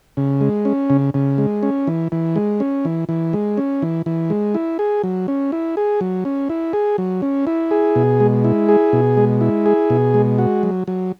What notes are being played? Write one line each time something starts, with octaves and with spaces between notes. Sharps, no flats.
C#3
G#3
C#4
C#3
C#3
G#3
C#4
E3
E3
G#3
C#4
E3
E3
G#3
C#4
E3
E3
G#3
E4
G#4
F#3
C#4
E4
G#4
F#3
C#4
E4
G#4
F#3
C#4
E4
G#4
B2
G#3
E4
G#4
B2
G#3
E4
G#4
B2
G#3
F#4
F#3
F#3